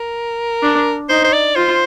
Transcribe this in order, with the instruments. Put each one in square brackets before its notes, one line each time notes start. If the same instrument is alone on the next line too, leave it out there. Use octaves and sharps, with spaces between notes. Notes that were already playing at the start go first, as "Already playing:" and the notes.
Already playing: [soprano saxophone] A#4
[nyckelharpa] D4
[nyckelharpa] D#4 [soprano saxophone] C5
[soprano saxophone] C5
D5
[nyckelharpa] F4 [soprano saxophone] C5